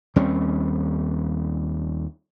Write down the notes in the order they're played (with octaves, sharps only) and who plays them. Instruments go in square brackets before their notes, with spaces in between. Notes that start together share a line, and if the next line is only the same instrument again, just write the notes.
[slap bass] D#2 G3 C4 C#4